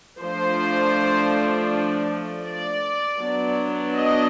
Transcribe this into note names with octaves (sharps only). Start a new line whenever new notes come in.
F3 A3 D4 C5
D5
F#3 B3 D4
D#5